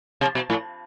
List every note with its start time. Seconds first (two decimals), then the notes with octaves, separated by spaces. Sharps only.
0.21 C3
0.35 B2
0.50 A2